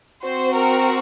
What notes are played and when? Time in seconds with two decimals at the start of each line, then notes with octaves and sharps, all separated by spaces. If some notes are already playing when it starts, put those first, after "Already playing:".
0.24 C4 F#4 C5
0.56 A#4